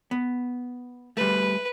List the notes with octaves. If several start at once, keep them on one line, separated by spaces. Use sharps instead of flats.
B3
G3 A3 B4